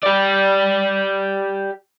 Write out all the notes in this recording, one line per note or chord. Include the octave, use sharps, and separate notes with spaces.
G4 D5